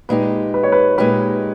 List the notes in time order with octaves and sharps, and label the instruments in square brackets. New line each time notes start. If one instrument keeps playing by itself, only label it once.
[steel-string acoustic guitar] A#2 G#3 D#4 G4 [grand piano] B4
[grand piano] B4
C#5
B4
[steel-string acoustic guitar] A#2 G#3 D#4 G4 [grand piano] B4